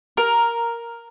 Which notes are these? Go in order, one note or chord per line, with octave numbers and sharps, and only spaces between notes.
A#4